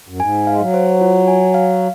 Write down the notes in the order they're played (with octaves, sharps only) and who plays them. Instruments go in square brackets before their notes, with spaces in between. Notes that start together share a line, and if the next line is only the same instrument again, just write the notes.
[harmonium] F#2
[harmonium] G#2 [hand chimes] G#5
[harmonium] G#3 [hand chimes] F5
[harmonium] F#3
[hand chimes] C5
F4
G#5
F5